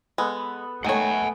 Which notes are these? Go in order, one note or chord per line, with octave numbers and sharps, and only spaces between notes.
G#3 B3 A4
D#3 A3 C#5 F#5 G#5